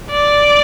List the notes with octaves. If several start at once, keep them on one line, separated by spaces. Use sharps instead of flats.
D5